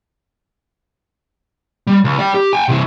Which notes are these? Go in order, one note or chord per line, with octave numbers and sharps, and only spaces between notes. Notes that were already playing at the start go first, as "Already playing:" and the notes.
G3
C#2
D5 G5
G4
G5 G#5
C3 E3